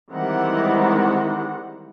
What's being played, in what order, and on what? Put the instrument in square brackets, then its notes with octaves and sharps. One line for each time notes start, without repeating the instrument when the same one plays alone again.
[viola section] D#3 E3 G3 G#3 C4 F#5